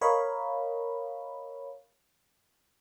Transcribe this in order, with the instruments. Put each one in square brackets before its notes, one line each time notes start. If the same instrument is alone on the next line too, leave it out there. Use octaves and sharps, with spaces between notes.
[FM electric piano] A#4 C#5 D#5 F5 B5